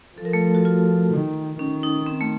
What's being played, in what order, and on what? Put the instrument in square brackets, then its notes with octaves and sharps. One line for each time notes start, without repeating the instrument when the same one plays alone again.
[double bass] F3 [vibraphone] A4
[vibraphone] A#4
A3 A4
F#4
F4
[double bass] D#3
[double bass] D#3 [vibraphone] C#4
[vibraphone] D#4
C4
A3